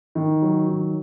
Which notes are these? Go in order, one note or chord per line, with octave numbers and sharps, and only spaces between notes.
D#3
F#3
D#3